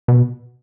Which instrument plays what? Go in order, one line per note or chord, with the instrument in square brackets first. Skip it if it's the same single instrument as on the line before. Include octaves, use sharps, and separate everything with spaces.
[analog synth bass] B2